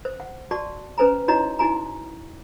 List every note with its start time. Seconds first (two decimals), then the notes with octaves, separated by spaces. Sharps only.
0.05 C5
0.20 F#5
0.51 F#4 D5 A5 C#6
0.98 C#4 B4 C5 G#5 A#5
1.28 D#4 E4 F#4 C#5 D#5 A#5
1.59 D#4 E4 F#4 G#5 A#5